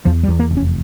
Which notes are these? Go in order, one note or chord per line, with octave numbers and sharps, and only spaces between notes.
E2 F3
G3
E2
A#3
F1
C#4